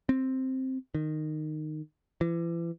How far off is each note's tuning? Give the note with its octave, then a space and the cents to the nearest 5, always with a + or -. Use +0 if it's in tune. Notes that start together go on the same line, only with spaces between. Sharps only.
C4 +5
D#3 -15
E3 +35